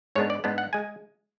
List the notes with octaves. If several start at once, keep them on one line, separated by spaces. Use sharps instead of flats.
G#2 G#3 B3 D4 C#5
D5
G#2 G#3 B3 D4
F#5
G#3 G#5